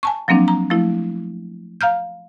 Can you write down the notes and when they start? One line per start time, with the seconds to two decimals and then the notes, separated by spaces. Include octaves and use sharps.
0.03 G#5 A5 C#6
0.28 F3 F#3 A#3 C4 D4
0.48 A#5
0.70 F3 A3 E4
1.81 F5 A#5 F6 G6